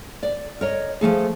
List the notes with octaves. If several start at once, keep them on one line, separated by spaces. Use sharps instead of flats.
D5
A#4 C#5 D#5
F3 F#3 A3 G#4